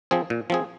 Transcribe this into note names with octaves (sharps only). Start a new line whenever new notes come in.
F3 C4 G#4
A#2
F3 C4 G#4